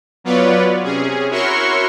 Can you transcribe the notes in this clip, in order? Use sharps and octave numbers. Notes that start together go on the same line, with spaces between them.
F#3 B3 F4 B4 C#5 D5
C3 C#4 G#4
E4 F#4 A#4 C#5 C6 C#6